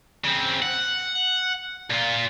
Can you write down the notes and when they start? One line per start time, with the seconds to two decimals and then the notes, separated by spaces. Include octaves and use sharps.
0.25 C#3 C4
0.63 F#5
1.90 A#2 F4